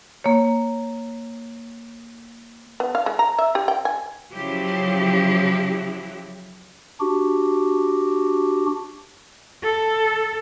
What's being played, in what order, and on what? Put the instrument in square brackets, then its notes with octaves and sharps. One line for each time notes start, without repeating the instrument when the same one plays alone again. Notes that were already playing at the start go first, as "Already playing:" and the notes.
[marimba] A#3 C#5
[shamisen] B3
F5
G#3
A#5
E5
G4
G5
G#5
[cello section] C#3 F3 F#3 E4 G4
[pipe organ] D4 F#4 G4
[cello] A4